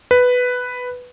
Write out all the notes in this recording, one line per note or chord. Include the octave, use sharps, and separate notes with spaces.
B4